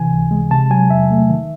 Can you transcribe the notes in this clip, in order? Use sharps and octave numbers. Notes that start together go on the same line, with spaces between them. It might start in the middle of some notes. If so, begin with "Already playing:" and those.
Already playing: C3 E3 G#5
C#2
G#3
C3 A5
F#3 G#5
E2 E5
A3
D#3